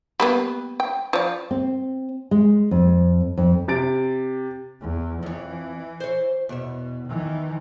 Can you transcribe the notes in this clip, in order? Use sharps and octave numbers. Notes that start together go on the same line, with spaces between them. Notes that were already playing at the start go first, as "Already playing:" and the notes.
G3 A#3 B3
G5
F3 D5
C4
G#3
F2
F2
C3 A6 D7
E2
F2 E3 C#5
C5 C#5
E2 B2 C#5 E5
D#3 E3